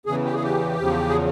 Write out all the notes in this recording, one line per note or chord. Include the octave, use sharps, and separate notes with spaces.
E2 C#3 E3 G#4
G4
G#4
G4
E2 C#3 F3
G#4